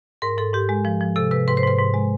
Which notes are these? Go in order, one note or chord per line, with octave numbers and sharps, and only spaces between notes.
G#2 A#4
G#2 A4
G#2 G4
G#3
F3
F3
C3 A4
C3 B4
G#2 B4
C5
G#2 B4
G#2
G#3